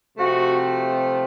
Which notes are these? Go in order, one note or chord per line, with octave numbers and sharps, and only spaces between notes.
C3 F3 A3 C4 F#4